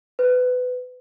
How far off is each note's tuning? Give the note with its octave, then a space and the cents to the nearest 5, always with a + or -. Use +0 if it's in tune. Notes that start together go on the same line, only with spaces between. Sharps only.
B4 +20